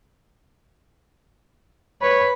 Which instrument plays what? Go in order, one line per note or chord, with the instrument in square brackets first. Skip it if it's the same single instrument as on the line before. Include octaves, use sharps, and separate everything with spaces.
[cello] B4 [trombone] C#5 [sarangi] B5